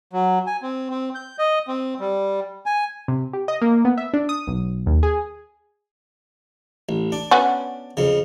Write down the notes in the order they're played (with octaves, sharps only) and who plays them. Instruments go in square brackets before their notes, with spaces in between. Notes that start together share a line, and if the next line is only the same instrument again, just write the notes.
[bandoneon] F#3
G#5
C4
C4
G6
D#5
C4
G3
G#5
[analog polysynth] C3
G4
D#5
A#3
B3
E5
D4
D#6
B1
D#2
G#4
[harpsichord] A1
D4
[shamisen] B3 C#4 F#4
[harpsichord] F2 C#3